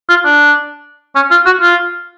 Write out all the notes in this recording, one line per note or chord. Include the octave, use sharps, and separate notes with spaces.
F4
D4
C#4
F4
F#4
F4